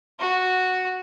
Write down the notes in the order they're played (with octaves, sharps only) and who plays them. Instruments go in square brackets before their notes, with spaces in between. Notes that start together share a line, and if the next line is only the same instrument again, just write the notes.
[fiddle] F#4